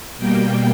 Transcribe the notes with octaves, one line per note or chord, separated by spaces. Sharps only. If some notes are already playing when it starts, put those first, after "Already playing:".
B2 G3 A#3 G5